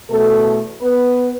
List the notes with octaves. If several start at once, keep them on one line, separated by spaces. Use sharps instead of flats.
E2 B2 A3 A4
B3 B4